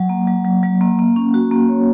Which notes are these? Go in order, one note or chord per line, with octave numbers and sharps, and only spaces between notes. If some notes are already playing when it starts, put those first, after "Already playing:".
Already playing: F#3
A#3
F#3
F#3
F#3
A#3
A#3
C#4
F#4
A#3
C#5